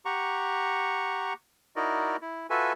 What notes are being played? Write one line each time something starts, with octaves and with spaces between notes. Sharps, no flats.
G4 F#5 A#5 C#6
D#4 E4 F#4 A#4 D5 D#5
E4
F4 F#4 A4 B4 E5 G#5